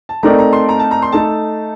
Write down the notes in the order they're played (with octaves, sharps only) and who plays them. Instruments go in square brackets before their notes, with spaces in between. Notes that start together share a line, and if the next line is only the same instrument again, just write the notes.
[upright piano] A5
[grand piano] A3 C4 D#4 A#4 D5 [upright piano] A#5
[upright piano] A#5
C6
A#5
A5
A#5
C6
[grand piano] A3 D#4 A4 [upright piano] A5